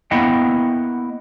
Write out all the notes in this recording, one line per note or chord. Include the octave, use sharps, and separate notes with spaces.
A#3 B3 E4 D#5 F#5 G5